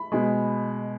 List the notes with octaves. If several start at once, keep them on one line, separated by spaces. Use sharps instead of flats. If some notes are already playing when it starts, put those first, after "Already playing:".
Already playing: B5
B2 G#3